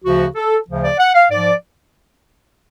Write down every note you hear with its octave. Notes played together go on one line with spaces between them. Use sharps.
D2 C#3 F3 F#4
A4
D2 C#3 F3
D5
F#5
F5
G#2 F3 D5